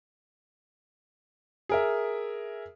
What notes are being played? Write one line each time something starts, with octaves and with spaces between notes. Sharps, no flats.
G#4 A#4 E5